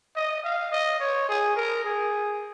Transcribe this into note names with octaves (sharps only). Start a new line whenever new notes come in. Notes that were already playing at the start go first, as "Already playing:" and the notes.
D#5
F5
D#5
C#5
G#4
A#4
G#4